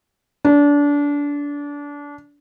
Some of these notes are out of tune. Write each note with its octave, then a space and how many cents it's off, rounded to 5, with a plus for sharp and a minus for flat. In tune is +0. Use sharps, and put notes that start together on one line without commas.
D4 -25